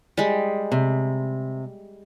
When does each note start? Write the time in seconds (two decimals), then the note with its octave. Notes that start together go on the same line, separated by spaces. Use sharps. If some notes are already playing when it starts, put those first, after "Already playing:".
0.17 G3 G#3
0.72 C3